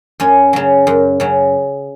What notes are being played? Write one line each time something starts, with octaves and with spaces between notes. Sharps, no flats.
F#2 C#4
C#3 F#3
F#2
C#3 F#3